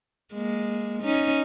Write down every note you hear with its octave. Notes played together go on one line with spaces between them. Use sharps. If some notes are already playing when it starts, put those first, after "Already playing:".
G#3 A#3
C#4 D#4